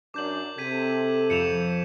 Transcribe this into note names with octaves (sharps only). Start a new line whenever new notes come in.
F#2 C#4 D4 D6 G6 F#7
C3 A4 G#6 B6 D#7
F2 C#7 E7 F7